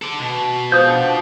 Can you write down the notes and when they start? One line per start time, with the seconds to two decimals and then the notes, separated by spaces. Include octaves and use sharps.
0.02 A4 D5
0.19 B2
0.72 F3 G#3 D#6 G6
0.89 D4 F#5